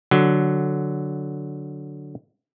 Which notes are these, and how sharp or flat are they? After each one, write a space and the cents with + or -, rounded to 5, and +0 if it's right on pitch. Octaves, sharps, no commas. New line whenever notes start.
D3 +0 F#3 +0